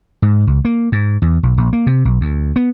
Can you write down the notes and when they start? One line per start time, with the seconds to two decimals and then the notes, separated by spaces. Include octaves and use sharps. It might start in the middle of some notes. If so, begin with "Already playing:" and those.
0.22 G#2
0.47 C#2
0.65 A#3
0.92 G#2
1.22 E2
1.43 B1
1.58 A#1
1.73 A#3
1.87 C3
2.05 B1
2.21 D2
2.56 B3